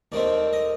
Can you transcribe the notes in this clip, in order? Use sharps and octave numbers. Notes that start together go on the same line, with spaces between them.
D#2 D#3 A3 C4 D5
D#5